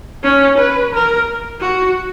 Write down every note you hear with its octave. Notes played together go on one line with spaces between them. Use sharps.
C#4
B4
A#4
F#4